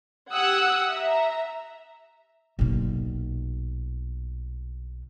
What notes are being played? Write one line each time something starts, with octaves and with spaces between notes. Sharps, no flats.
G4 F#5 D#6 E6 F#6 G#6
E5 A#5
B1 A#2